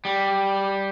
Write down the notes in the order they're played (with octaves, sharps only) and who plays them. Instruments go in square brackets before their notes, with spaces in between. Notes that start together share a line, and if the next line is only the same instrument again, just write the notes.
[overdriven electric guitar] G3